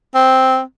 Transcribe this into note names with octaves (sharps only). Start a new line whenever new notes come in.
C4